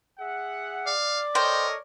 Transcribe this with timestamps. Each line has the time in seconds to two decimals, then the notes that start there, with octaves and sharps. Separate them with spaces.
0.18 G#4 E5 F#5
0.86 D5 F5
1.35 A4 A#4 C5 C#5 D#5 G5